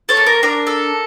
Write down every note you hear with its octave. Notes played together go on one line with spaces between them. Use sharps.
A4 C#5
A#3
A#4
D4 A#4
A4